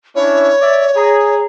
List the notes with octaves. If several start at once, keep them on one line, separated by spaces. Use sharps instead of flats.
C#4 D4 E4 C#5
D5 E5
G#4 A#5